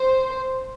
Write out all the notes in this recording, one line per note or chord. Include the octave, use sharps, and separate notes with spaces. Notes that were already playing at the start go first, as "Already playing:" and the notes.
Already playing: C5